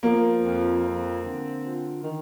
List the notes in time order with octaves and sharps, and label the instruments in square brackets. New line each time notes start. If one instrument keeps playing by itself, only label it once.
[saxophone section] F3 [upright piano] A#3
[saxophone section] F2
C4
D3
F4
D#3